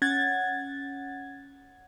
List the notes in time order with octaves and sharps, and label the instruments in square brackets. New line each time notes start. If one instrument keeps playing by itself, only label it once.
[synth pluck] C#4 F#5 G#6 A6